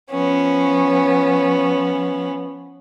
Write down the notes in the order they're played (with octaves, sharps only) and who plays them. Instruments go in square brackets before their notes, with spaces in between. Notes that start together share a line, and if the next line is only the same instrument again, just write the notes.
[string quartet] F3 B3 C#4